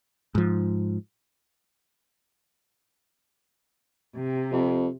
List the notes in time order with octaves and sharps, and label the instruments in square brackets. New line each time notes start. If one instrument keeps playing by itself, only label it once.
[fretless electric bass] G#2 F3
[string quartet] C3
[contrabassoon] F2